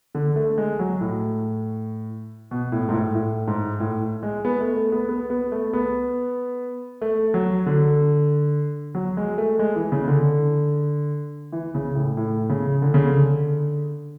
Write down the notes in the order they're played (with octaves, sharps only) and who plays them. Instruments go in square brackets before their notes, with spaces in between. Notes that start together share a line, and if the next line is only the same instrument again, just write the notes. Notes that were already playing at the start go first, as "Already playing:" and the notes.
[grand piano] D3
A3
G#3
F#3
A2
B2
A2
G#2
A2
A2
G#2
A2
G#3
B3
A3
A3
B3
B3
B3
A3
B3
A3
F#3
D3
F#3
G#3
A3
G#3
E3
C#3
D3
E3
C#3
A2
A2
C#3
D3
C#3
D3